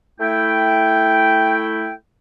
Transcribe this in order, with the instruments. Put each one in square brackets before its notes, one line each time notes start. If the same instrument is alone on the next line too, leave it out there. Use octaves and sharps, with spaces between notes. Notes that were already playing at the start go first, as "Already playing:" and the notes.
[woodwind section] A3 E4 G5